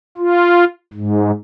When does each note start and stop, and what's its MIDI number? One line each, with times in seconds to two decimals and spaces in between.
0.18 0.64 65
0.94 1.31 44